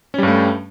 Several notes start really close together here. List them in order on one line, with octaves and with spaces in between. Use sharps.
C#4 G3 G2 A3